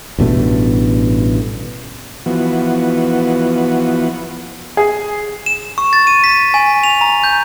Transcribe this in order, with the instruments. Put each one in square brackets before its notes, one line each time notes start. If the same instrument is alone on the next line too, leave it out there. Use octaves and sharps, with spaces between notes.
[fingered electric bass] A1 G2 B2 A3
[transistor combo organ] E3 F3 B3 F#4
[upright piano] G#4
[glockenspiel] E7
C#6
A6
D#7
B6
G#5
F7
A#5
G6